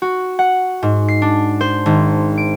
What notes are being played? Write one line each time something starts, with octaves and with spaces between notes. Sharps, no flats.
F#4
F#5
G#2
C7
D4
C5
G#1
D7